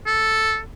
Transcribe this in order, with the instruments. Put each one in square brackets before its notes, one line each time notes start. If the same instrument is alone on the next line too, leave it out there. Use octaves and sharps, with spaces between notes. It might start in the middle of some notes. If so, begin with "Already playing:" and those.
[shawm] A4